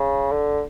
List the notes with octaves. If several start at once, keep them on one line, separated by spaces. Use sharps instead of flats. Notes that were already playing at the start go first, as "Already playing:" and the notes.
Already playing: C#3
D3